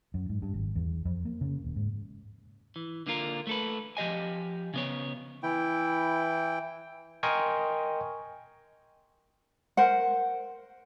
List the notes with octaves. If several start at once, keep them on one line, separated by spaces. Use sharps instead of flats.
F#2
G#2
G2
G#1
E2
F2
A#3
C#3
D#1
G#2
E3
D3 A#3 F4 A#4
A3 A4 B4
F3 G4 D#5 G#5
C#3 B3 C#5
E3 E4 G5
A#4 D#5 G5 G#5 C6 C#6
A#4 C5 F#5